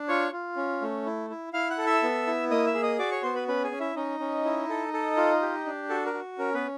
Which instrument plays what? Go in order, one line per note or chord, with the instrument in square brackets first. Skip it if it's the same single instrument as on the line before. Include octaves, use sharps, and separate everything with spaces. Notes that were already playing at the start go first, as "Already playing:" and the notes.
Already playing: [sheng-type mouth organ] D4
F4 C#5 C#6
F4
C#4
A3
E4
E4
E4 F5 F6
F#5 F#6
A4
E5 E6
B3
E4
A#3 D#5 D#6
E5 E6
G#4
D#5 D#6
F#4 D5 D6
C#5 C#6
B3 C5 C6
B4 B5
C#4 B4 B5
G#4 G#5
C#4
E4 E5
C#4 D#4 D#5
C#4
E4
A4
A4
F4
G4
D4
F#4 A4
A#4
F#4
C#4 A#4
B3 B4